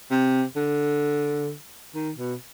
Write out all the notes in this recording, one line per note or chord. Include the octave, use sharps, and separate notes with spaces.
C3
D3
D#3
B2